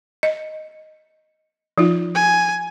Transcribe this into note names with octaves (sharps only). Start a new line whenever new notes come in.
D#5
F3 D#4 F4
G#5